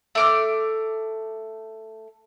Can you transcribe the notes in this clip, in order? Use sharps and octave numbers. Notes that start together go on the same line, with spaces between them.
A3 D6 F6